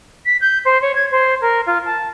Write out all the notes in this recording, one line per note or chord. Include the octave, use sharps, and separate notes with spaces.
B6
G6
C5
C#5
G#6
C5
A#4
F4
A5